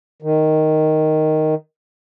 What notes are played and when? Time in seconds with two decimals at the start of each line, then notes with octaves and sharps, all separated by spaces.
0.22 D#3